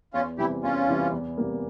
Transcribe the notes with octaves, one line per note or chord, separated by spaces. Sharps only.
E2 C#4 F4
C3 E3 G3 E4 G4
E2 C#4 F4
C3 E3 G3
E2
C3 G3 A#3